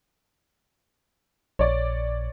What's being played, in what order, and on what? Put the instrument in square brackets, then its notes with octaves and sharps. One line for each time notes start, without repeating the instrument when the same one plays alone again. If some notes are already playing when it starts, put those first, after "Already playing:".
[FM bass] A#1 [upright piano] C#5 D5